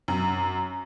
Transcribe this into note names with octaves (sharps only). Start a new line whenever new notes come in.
F#2